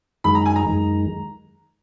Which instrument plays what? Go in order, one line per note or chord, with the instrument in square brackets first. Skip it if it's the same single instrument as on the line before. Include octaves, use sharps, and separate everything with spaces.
[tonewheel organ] F#2 D#3 G#3 [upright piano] B5
[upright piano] A#5
G#5
A#5
[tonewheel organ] F#2 D#3 G#3